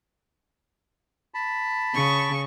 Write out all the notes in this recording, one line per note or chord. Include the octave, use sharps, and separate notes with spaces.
A5 B5
C#3 C#6